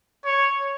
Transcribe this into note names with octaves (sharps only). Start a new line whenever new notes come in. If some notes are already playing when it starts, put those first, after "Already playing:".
C#5